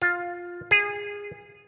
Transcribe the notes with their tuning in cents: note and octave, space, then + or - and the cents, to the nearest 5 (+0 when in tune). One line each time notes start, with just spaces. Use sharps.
F4 +10
G#4 -20